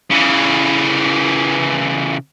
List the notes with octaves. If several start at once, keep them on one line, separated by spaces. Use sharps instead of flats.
C#3 E3